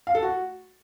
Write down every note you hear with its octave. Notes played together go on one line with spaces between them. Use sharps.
F5
A4
F#4